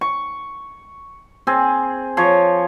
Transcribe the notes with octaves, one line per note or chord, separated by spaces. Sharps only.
C#6
C4 G#4
F3 C#5